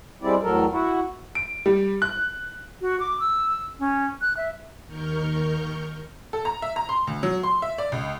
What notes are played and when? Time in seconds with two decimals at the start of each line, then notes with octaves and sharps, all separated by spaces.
0.22 G3 G#3 C4 E4 D5
0.43 E2 A2 F#3 A4 A#4
0.71 E4 F#4
1.35 D7
1.66 G3
2.02 F#6
2.81 F#4
3.00 D6
3.20 E6
3.79 C#4
4.21 F#6
4.37 E5
4.87 D#2 D#3 A#4 C#6 F6 G6
6.33 A4
6.45 A#5
6.62 E5
6.76 A#5
6.89 C6
7.07 D2
7.23 F#3
7.43 C6
7.62 E5
7.78 D5
7.92 C#2